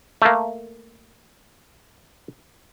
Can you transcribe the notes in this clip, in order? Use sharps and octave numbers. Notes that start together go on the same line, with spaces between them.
A3 A#3